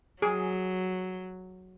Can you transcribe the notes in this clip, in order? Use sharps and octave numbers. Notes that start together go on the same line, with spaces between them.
F#3 G#4